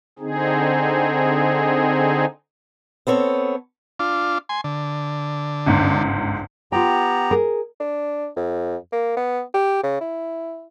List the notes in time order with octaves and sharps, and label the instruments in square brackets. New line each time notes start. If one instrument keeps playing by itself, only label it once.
[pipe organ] D3 C4 D#4 G#4
[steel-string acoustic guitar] B3 C4 A4 C#5
[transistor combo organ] D4 F4
G#5 C6
D3
[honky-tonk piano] G1 C#2 G#2
[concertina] B3 G4 A#5 [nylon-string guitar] F4 G5
[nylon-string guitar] G#4 A#4
[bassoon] D4
F2
A#3
B3
G4
C#3
E4